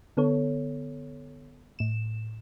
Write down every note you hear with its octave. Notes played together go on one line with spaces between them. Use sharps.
D3 B3 A4 C#5
A2 E7